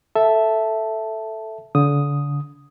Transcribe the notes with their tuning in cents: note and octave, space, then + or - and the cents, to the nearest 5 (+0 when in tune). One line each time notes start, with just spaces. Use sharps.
A4 +0 E5 +0 A5 +0
D3 -35 D#6 +0